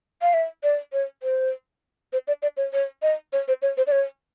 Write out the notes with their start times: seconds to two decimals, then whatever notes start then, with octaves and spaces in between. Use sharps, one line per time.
0.22 F5
0.34 E5
0.63 D5
0.93 C#5
1.23 C5
2.13 C5
2.28 D5
2.42 D5
2.57 C#5
2.73 C#5
3.02 D#5
3.33 C#5
3.48 C5
3.62 C#5
3.77 C5
3.87 D5
3.92 C#5